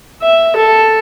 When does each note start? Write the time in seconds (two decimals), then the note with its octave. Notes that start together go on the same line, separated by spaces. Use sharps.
0.22 E5
0.56 A4